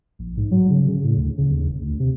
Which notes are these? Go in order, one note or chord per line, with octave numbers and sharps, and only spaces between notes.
A#1
G#2
F#3
C#3
C#3
A2
D2
C#3
D#2
E1
D2
C3